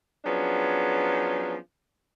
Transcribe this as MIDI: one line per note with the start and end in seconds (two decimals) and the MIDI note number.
0.25 1.56 53
0.25 1.56 54
0.25 1.56 59
0.25 1.56 61
0.25 1.56 62
0.25 1.56 68